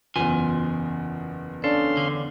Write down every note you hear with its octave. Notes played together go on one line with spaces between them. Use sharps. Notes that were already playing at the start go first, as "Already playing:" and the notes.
F#1 E2 F4 G#5
C#4 D4 A4 F5 C6
D3